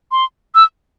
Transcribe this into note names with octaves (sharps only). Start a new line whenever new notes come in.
C6
E6